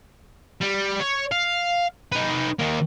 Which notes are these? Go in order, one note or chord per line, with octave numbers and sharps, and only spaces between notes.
G3
C#5
F5
D#4 B4
D#3 A#3